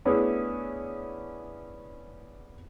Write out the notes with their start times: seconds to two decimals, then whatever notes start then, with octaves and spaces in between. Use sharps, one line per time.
0.05 A3 B3 C#4 D4 E4 G#4